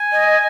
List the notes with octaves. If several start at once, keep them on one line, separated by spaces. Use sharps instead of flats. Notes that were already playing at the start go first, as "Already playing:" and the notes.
Already playing: G#5
D#5